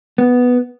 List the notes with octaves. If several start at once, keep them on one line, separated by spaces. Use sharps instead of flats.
B3